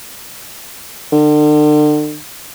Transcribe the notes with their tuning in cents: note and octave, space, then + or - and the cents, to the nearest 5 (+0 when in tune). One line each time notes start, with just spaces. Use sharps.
D3 +40